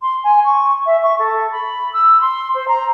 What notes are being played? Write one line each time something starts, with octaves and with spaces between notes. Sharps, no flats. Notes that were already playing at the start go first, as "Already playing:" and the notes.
C6
G#5
C#6
E5
C#6
A4
B5
E6
C6
C5
A#5